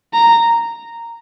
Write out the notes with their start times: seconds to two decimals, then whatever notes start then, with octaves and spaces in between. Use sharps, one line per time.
0.14 A#5